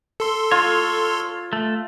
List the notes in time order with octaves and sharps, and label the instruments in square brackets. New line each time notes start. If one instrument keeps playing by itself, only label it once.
[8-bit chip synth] A4 C6
[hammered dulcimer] F4 [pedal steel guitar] C#5
[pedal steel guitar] A3